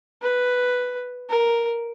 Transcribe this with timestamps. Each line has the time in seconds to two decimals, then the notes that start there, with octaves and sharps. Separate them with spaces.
0.22 B4
1.30 A#4